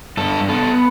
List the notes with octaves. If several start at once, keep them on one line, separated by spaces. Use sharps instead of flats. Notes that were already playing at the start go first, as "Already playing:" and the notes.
G2 A4
B3 A4